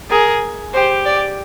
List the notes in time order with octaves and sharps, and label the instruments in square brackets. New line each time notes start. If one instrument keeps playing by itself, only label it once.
[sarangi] G#4 [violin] A#4
[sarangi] G4 [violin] C5
[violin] D5